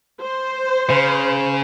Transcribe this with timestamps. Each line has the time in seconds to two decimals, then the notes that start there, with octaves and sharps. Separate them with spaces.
0.22 C5
0.90 C#3